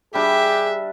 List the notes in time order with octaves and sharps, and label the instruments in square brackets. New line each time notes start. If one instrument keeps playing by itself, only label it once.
[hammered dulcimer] G3 D4 [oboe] G4 [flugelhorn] G#4 [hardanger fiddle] E5